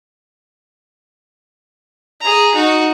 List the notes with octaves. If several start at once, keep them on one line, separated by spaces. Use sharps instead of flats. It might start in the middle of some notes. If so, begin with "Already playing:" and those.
G#4 A#5
D#4 F#4